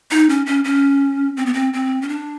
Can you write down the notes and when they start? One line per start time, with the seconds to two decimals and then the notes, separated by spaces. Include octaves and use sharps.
0.11 D#4
0.29 C#4
0.46 C#4
0.64 C#4
1.37 C4
1.46 B3
1.54 C4
1.73 C4
2.02 C#4
2.08 D4